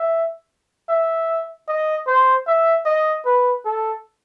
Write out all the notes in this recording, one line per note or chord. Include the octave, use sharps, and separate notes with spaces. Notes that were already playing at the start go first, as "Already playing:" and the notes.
Already playing: E5
E5
D#5
C5
E5
D#5
B4
A4